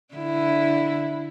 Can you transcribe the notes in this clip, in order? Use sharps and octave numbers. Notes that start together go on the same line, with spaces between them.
D3 E4